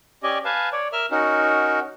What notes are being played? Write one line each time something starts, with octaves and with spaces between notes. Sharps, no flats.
C#4 G4 D5 D#5 G#5
B4 F5 G#5 A5
C#5 D5
A#4 E5 F6
C#4 D#4 F#4 A#4